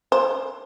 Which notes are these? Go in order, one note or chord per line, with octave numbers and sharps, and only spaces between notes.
C5